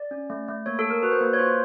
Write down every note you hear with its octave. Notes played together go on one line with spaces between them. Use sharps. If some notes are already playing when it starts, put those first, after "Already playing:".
Already playing: D5
C#4
A3
A3
A#3 C#5
A4
G#4
A#4
F#4 B4
C5
A#3 B4
C#5
F4 C5